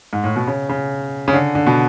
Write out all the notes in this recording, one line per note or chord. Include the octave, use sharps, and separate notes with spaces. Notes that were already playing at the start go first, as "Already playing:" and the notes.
G#2
A2
B2
C#3
C#3
C#3
D3
D3
B2